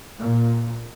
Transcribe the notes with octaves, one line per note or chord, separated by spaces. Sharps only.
A#2